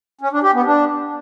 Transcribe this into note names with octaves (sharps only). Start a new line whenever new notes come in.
C#4
D4
G4
B3
D4